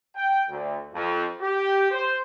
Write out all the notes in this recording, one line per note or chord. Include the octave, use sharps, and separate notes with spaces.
G5
D2
F2
G4
C5